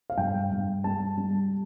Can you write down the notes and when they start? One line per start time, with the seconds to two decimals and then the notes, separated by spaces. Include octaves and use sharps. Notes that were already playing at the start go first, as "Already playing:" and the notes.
0.10 F5
0.17 G2 G5
0.51 G2
0.84 G3 A5
1.17 G3